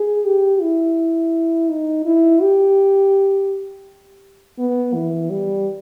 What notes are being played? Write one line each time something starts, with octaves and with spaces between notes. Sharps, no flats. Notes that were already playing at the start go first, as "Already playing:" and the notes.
Already playing: G#4
G4
E4
D#4
E4
G4
B3
E3
G3